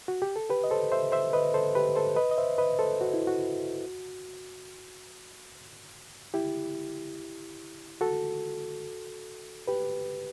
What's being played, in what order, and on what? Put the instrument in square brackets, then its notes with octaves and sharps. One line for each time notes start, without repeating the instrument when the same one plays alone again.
[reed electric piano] F#4
G4
A4
G4 B4
D#5
A4 C5
C5 E5
C5 E5
B4 D#5
A4 C5
G4 B4
A4 C5
B4 D#5
D#5
C5 E5
B4 D#5
A4 C5
F#4
E4
F#4
E4 G4
F#4 A4
G4 B4